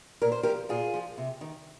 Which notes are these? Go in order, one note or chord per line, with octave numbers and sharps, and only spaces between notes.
A#2 A#4
C5
F3 G4 A#4
A#2 F4 G#4
F3
C3
D#3